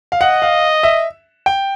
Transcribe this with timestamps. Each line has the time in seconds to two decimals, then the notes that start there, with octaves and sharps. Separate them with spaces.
0.12 F5
0.21 D#5 F#5
0.42 F5
0.83 E5
1.46 G5